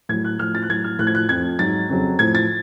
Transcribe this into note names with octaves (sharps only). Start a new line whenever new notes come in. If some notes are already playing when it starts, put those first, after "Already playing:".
A2 F#3 G#6
F#6
A2 F3 F6
A6
F#6
A2 F#3 G#6
F6
A2 F3 F#6 G#6
F#6
F2 F3 G#6
G#2 F#3 A6
F2 C#3 F#3
A2 F3 G#6
A6